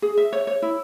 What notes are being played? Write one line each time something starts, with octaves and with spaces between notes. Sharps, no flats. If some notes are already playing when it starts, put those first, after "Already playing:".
G#4
E5
C#5
C#5
E4